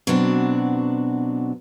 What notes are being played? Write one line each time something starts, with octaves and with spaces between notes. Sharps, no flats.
B2 F#3 C4 D4 F#4